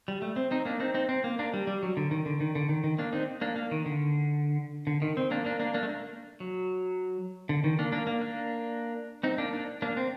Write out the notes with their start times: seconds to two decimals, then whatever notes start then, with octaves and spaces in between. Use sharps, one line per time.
0.08 G3
0.22 A3
0.36 C4
0.51 C4 D#4
0.65 A#3 D4
0.80 C4 D#4
0.94 C4 D#4
1.09 C4
1.24 A#3
1.39 A#3 D4
1.54 G3
1.67 G3
1.83 F#3
1.97 D3
2.11 D#3
2.26 D3
2.41 D#3
2.55 D3
2.69 D#3
2.84 D#3
2.99 A#3 D4
3.13 C4 D#4
3.41 A#3 D4
3.56 A#3
3.71 D#3
3.86 D3
4.87 D3
5.02 D#3
5.17 C4
5.31 A#3 D4
5.45 A#3 D4
5.60 A#3 D4
5.74 A#3 D4
5.83 A3
5.89 A#3
6.40 F#3
7.49 D3
7.64 D#3
7.79 A#3 D4
7.92 A#3 D4
8.07 A#3
8.21 A#3 D4
9.23 C4 D#4
9.38 A#3 D4
9.53 A#3 D4
9.82 A#3 D4
9.97 C4